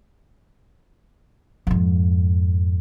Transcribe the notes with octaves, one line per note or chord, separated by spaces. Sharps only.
F2 G#2